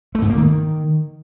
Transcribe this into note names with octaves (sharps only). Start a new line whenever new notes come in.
A3
G#2
A#3
D#3